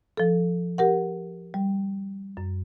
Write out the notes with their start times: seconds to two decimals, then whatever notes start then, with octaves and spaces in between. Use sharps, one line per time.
0.17 F3 A4
0.78 G4 A#4 F#5
1.54 G3
2.37 F#2